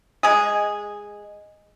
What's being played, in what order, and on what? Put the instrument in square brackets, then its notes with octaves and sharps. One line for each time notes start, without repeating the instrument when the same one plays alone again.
[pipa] G#3 G#4